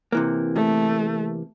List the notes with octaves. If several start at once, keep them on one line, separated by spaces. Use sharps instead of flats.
C3 E3 A#3
A3